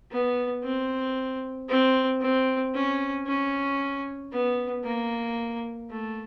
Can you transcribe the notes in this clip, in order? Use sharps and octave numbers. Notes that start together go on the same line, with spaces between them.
B3
C4
C4
C4
C#4
C#4
B3
A#3
A3